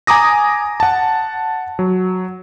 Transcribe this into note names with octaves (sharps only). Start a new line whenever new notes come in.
G#5 A#5 D6 D#6 A#6
F#5 A5
F#3